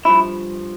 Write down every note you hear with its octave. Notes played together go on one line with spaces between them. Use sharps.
G2 F3 E4